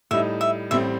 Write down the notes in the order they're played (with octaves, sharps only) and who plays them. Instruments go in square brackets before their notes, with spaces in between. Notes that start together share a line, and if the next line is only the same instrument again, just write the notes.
[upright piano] A2 G3 D#4 [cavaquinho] E5
[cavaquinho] E5
[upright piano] A1 A2 G3 C4 [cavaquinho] E5